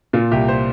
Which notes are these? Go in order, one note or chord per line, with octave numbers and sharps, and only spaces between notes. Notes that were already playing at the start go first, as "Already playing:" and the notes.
A#2 F4
C2 G4
C5